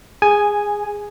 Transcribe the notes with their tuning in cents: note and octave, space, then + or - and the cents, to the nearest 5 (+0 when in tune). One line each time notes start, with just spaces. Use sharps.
G#4 -15 G#5 +0